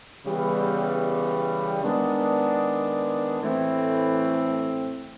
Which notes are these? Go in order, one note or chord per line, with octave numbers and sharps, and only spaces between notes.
C#3 E3 G3 B3
D#3 G#3 B3 D4
A2 E3 A3 C4 E4